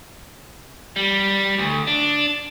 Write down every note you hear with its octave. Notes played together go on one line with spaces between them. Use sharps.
G3
D2
D4